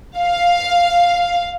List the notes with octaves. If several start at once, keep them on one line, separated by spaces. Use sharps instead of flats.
F5